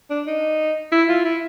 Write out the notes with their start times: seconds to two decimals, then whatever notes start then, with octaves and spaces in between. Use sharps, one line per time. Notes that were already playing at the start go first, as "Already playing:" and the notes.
0.10 D4
0.27 D#4
0.92 E4
1.09 F4
1.25 E4